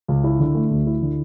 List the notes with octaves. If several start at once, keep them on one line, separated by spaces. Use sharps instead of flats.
C#2
E4
D3
A3
D2
E4
D3